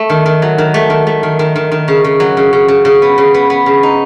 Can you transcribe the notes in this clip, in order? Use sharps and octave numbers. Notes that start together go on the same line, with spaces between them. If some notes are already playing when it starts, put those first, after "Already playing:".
Already playing: A3
D#3
D#3
F#3
D#3
A3
D#3
A3
D#3
D#3
D#3
D#3
C#3
C#3
F#3
C#3
C#3
C#3
C#3
B3
C#3
B3
B3
C#3
D#4